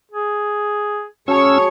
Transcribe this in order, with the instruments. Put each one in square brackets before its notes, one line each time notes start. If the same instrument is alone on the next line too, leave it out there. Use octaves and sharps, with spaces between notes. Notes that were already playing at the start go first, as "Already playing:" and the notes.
[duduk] G#4
[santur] F#3 A5 [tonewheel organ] C#4 E6 [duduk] G#4 [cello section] C#5